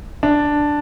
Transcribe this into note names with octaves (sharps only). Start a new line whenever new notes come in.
D4